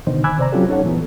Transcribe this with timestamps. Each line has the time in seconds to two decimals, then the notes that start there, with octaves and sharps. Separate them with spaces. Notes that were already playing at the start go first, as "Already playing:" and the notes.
0.07 B2 D3 D#3 D#4 C5
0.24 G#5 B5 D6 E6 F#6 G#6
0.38 C3 C5 D5 A#5
0.52 F#3 C4 C#4 F4 G4 A4
0.69 C#4 D#4 A4 C#5 F#5
0.84 A#2 E3 B3